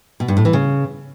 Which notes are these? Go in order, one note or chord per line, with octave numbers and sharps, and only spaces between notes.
B2
G2
A2
E3
C#3